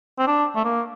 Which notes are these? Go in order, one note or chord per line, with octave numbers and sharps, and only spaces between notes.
C4
D4
A3
A#3